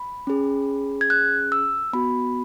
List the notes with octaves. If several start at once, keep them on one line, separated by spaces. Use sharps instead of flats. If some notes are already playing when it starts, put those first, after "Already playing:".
Already playing: B5
C#4 G#4
G#6
F#6
E6
B3 F#4 B5